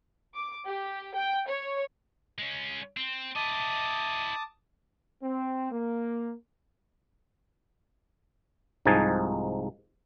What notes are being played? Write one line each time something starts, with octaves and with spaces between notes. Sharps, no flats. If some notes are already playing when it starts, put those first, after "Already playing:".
D6
G4
G5
C#5
G#3 C#4
C4
E4 D#5 A5 D6 D#6
C4
A#3
C2 G#2 F3 D#4 G#5 A5